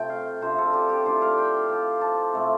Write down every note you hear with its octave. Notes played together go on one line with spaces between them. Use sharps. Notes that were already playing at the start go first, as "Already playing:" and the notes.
Already playing: C3 A3 F4 G5
F5
C3 F3 D4 C5
A4
G4
G4
A2 F3 D4 F4 C5
F5
G5
F3 C4 F4
A5
C3 A3 C4